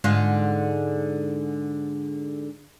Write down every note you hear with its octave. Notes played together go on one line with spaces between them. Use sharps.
G#2 D3 F4